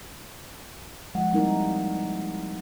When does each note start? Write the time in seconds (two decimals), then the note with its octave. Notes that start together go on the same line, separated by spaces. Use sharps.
1.15 F3 G#3 F#5
1.33 G3 A#3 C4 D#4 E4 A#4